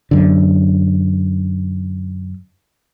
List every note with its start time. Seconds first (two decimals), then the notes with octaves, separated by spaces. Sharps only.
0.11 F#2 D3